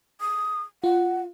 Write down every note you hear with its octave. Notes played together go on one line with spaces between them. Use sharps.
D#6
F4 F#5